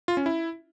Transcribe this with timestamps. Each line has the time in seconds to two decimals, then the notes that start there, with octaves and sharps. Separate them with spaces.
0.08 F4
0.17 C#4
0.26 E4